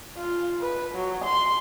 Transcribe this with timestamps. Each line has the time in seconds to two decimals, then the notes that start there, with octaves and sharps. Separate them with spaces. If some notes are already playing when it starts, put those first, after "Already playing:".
0.17 F4
0.61 B4
0.95 F#3
1.24 C6